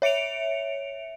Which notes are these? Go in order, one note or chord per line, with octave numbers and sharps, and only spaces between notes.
C#5 E5 C#7 D7 F7